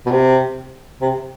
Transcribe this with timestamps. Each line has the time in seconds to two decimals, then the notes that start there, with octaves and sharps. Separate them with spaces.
0.06 B2
0.11 C3
1.01 C3